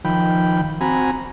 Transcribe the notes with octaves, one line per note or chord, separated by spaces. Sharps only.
D#3 F3 G5 B5
C4 F#4 G#5 A#5 B5